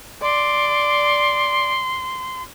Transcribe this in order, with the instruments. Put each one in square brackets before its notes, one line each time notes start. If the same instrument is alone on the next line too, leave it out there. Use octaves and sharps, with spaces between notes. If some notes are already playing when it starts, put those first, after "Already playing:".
[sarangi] D5 [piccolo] C6